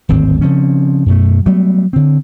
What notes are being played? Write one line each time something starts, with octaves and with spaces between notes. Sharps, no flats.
D1 G#1 D#2 C4
C#3 F3 C4 C#4
F#2 B2 A3
F#3 G3 A3 B3
D3 C4